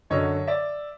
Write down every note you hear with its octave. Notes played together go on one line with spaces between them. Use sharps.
F#2 D3 F#3 C#5 D#5
D5 E5